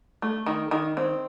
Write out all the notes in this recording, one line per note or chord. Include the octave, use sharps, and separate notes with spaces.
A3
D#3
D#3
C4